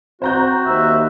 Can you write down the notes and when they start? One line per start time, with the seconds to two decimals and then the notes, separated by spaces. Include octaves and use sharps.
0.22 C4 F#4 C5 A#5 G6
0.66 D#2 E5